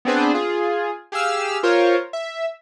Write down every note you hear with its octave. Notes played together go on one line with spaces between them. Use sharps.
B3 C4 D4 G#4 B4 C5
F4 G#4
G4 G#4 F5 E6 F6
F4 A#4 C5 C#5
E5